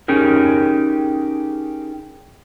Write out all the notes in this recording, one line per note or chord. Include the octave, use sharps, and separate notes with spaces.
C#4 D#4 G4 G#4 A#4